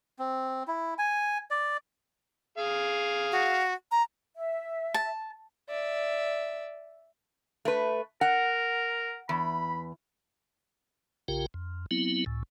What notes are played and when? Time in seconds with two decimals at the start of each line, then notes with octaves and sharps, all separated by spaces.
0.19 C4
0.68 E4
0.98 G#5
1.51 D5
2.58 G#4 F5
3.31 F#4
3.91 A#5
4.35 E5
4.94 A5
5.69 D5 E5
7.65 A3 B4
8.21 A#4 F#5
9.29 E2 B5
11.28 A#1 C#3 F4 G4 A#4 G5
11.54 F2
11.91 F#3 B3 C4 E4
12.26 C#2 A2